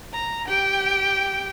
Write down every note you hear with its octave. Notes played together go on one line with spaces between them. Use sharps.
A#5
G4 G5